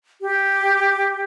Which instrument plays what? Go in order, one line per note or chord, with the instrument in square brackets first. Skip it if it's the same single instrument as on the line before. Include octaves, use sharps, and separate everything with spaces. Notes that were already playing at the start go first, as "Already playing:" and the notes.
[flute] G4